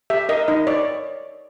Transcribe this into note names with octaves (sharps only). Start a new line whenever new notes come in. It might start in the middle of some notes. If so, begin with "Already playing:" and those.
G4 E5
A#4 D#5
D#4 D#5
C#5 D5